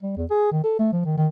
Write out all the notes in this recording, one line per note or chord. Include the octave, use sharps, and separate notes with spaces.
G3
E2
G#4
D#3
A4
A3
F3
D#3
D#3